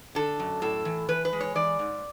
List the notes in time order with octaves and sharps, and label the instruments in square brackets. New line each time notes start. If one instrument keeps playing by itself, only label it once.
[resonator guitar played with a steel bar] D3 A4
F#2
A2 A4
E3
E3 B4
B4
G#3
C#5
E3 D5
G#2